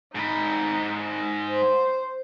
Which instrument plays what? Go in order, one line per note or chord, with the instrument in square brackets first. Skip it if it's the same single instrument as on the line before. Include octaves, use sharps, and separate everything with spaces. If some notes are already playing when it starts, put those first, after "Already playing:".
[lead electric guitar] G#2 B5 [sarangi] D#4
[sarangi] C5